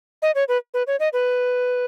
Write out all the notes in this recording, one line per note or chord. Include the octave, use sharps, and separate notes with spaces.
D#5
C#5
B4
B4
C#5
D#5
B4